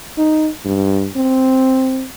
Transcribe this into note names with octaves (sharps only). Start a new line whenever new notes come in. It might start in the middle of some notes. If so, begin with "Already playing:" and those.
D#4
G2
C4